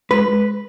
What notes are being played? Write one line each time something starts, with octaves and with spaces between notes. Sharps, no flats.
G#3 B4